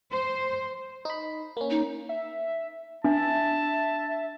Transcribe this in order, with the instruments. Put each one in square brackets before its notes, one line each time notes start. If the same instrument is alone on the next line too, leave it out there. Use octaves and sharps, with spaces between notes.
[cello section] C5
[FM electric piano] D#4 B5
A#3 C#4
[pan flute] D#4
[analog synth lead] E5
[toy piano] D4 [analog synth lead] E5 [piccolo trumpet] A5